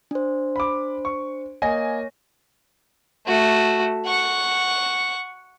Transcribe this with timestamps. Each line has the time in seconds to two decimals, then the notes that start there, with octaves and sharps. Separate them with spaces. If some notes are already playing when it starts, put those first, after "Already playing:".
0.11 D4 C5
0.56 B5 D6
1.05 C#6
1.62 A#3 C#5 D#5 G#5 A#6
3.27 A3 F#4
4.06 F#5 C#6